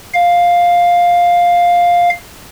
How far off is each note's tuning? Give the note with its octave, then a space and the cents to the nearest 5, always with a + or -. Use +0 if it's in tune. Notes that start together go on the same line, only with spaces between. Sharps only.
F5 +5